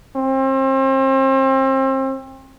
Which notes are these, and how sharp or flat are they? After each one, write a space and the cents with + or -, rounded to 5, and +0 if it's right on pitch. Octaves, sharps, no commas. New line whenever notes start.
C4 +35